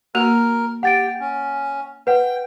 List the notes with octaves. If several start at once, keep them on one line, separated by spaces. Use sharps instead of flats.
A#3 F#4 A#4
G4 F#5 G5 A6 D7
C#4
B4 F#5 G5